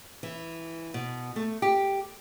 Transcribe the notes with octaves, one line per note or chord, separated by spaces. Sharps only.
E3
B2
A3
G4